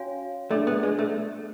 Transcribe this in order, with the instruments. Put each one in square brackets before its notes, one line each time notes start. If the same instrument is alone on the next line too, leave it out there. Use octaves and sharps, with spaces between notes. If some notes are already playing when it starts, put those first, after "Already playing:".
Already playing: [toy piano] C#4 F#4 C#5 F5 G#5
[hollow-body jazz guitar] A3 [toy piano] D4 G#4 D5
[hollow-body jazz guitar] B3
G#3
A3